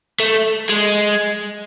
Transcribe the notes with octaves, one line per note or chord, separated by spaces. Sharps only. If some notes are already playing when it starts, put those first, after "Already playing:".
A3
G#3